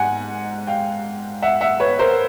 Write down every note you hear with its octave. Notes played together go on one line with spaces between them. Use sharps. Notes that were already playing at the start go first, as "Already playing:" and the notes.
Already playing: G#2 F#5 G#5
F5 G5
E5 F#5
E5 F#5
B4 C#5
A#4 C5